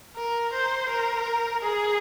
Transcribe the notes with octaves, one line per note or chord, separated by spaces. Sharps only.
A#4
C5
A#4
G#4